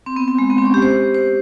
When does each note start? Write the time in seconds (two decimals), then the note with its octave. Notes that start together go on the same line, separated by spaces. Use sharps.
0.06 C4
0.16 B3
0.28 C4
0.39 G#3
0.50 B3
0.58 C4
0.66 C#4
0.74 G4
0.82 C5
1.14 C5